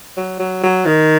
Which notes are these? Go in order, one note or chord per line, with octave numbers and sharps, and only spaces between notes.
F#3
F#3
F#3
D#3